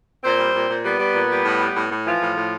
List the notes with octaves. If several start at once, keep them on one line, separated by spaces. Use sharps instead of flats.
A#2 C4 C5
G3
A#2
A#2
G3 B3 B4
G3
A#2
G3
A2
G3
A2
A2
E3 F3 F4
A2
A2